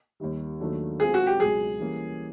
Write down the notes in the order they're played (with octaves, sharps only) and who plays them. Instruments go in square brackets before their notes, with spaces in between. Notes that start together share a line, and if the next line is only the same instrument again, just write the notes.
[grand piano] D#2 D#3 G3
D#2 D#3 F#3 A3 D4
[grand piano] B2 G#3 C4 F4 A4 [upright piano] G#4
[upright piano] F#4
G4
[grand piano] C#2 B2 F#3 [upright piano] G#4
[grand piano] E3 G3 A#3 C#4